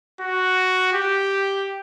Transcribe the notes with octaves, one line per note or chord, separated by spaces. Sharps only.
F#4
G4